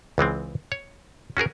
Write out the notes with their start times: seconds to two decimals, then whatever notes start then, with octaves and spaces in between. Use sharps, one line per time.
0.18 C#2 E3 G#3 C4
0.72 C#5
1.37 C#4 F#4 G#4 A#4